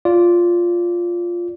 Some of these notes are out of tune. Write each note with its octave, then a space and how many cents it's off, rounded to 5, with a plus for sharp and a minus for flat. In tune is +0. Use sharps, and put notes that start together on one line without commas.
F4 +0 D5 -15